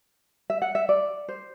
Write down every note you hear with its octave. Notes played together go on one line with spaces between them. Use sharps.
E5
F#5
E5
D5
C5